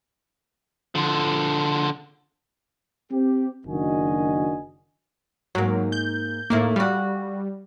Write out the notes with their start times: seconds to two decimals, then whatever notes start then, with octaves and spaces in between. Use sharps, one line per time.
0.95 D3 F3
3.12 C4 G4
3.67 F#1 D#3 D4 F#4 D#5 G#5
5.55 G#2 F#3 A#3
5.92 G6
6.50 D#2 A2 A#3 E4
6.76 G3 F#4 F5